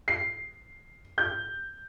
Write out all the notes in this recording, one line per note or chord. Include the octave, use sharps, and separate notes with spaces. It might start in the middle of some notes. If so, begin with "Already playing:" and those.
C7
G6